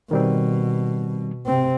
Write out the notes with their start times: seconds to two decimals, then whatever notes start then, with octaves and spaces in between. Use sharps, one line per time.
0.11 B2 D#3 G3 C4
1.46 C3 C4